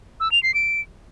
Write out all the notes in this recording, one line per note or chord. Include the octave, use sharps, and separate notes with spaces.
E6
F7
C7
D7